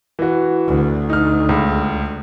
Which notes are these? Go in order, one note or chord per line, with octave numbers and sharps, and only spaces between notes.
E3 F#4
D2
D#4 F6
C#2